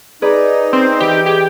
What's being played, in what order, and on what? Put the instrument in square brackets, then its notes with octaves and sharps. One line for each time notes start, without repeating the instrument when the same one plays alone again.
[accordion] D#4 [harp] G#4 B4 D5
[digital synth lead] C4
[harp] E3 [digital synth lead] G4
[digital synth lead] G4 [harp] G#4